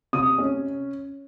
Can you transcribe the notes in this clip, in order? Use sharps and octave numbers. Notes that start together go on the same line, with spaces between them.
C3 D#6
C#4